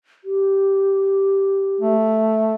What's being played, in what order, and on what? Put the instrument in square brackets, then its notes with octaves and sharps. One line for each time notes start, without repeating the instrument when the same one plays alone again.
[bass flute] G4
[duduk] A3